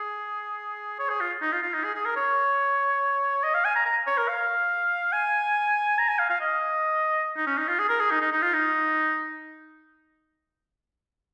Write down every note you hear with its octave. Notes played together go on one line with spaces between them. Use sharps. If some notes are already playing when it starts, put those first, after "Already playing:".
Already playing: G#4
C#5
G#4
F4
D#4
F4
F4
D#4
G#4
G#4
A#4
C#5
D#5
F5
G#5
A#5
A#5
C#5
A#4
F5
G#5
A#5
G#5
F5
F5
D#5
D#4
C#4
D#4
F4
G#4
A#4
G#4
D#4
D#4
D#4
F4
D#4